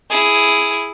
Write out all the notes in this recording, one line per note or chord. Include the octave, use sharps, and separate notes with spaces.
E4 G#4